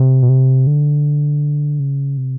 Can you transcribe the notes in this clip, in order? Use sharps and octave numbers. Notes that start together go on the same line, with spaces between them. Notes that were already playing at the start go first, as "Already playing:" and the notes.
Already playing: C3
B2
C3
D3
C#3
C3